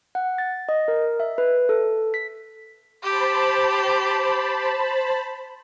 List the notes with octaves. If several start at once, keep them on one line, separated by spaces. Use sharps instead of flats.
F#5
A6
D#5
A#4
E5
B4
A4
B6
G4 C5 A5 B5